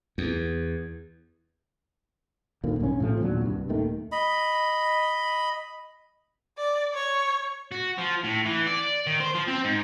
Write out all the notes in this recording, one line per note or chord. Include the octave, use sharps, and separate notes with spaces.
E2
D#1 D2 D#3 A#3
B1 G2 C#4
A2 C3 F3 A3
D#2 A#2 F#3 D4
C2 G2
D#1 D#2 D#3 A3
D#5 B5
D5
C#5
F#4
F3
A2
E3
D5
D#3
C5
F3
C4
G#2